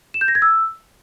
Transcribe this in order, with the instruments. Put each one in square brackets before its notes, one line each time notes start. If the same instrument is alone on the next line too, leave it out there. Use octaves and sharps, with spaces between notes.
[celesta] E7
G6
A#6
G#6
E6